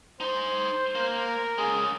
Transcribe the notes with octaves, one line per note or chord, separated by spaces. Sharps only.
D#4 C5 C6
A#3 A#4
C#3 G#3 G#4